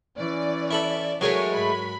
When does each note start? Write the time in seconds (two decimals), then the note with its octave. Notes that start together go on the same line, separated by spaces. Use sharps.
0.17 E3 C#4 D5
0.71 E4 A4 B5
1.21 F#3 G#3 A3 A#4 C#5 G#5
1.53 G#2 B5